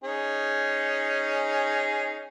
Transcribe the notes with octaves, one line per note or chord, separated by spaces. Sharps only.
C#4 D#4 G#4